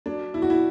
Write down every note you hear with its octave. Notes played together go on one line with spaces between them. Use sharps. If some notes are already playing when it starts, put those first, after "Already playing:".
F#3 D4
B2 E4
F#4
E4